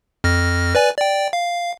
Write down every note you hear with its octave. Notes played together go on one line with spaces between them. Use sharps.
F2 F6 A#6
B4 D5 G#5
D5 G5
F5